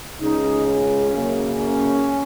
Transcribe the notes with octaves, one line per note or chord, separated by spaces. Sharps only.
C#2 C#3 G#3 D#4
C#4
F#2 C#3 A#3
C#4